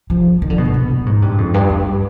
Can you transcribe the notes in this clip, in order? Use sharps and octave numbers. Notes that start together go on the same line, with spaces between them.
F3
D#3
D3
B2
G#2
B2
B2
G#2
G2
F2
G2
G2